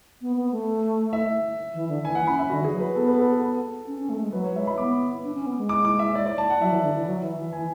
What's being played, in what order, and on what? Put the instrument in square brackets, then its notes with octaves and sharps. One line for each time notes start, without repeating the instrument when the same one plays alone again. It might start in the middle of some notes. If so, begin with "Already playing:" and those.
[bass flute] B3
B3
A3
[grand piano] E5
[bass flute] E3
D3
[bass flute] E3 [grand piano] G#5
[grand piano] F#5
[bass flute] C#4 [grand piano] B5
[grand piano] E5
[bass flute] D3 [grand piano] F#4
[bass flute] E3
[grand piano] G#4
[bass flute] F#3
[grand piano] B4
[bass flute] B3 [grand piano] A4
[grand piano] B4
A4
[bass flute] C#4
C#4
A3
G#3
[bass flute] F#3 [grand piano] B4
[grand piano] C#5
[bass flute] G#3 [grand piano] E5
[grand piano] B5
[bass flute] B3 [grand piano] D6
[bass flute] D4
C#4
B3
G#3
[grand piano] D6
D6
E5
D5
D5
A5
F#5
[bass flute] F#3 [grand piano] E5
[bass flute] E3
D3
E3
F#3
E3
E3
[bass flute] E3 [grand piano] G#5